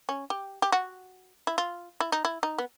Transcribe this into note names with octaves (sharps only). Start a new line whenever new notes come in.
C#4
G4
G4
F#4
E4
F4
E4
D#4
E4
D#4
B3